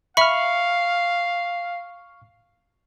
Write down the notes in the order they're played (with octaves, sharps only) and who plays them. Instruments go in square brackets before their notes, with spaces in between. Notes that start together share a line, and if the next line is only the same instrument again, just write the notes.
[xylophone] E5 B5 [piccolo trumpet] F5 [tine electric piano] C#6 F6